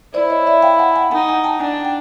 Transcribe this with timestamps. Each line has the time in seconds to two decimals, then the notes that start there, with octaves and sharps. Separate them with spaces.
0.13 E4 C5 D5
0.30 C#5 D#5
0.47 D5 E5
0.62 F5 G5
0.79 F#5 G#5
0.96 F#5 G#5
1.11 D#4 F#5 G#5
1.28 F#5 G#5
1.44 G5 A5
1.61 D4 F#5 G#5
1.85 G5